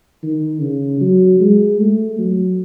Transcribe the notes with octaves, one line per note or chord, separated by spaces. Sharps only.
D#3
C#3
F#3
G#3
A3
F#3